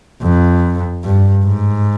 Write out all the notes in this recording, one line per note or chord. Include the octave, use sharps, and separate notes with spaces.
F2
G2
G#2